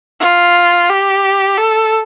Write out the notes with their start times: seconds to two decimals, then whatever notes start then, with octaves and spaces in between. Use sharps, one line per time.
0.20 F4
0.89 G4
1.58 A4